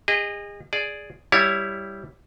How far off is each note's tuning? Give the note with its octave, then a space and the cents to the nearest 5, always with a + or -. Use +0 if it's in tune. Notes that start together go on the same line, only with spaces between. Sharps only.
G#4 -35 D#5 -10
G#4 +0 D5 +0
G3 +0 E4 +0 C#5 +5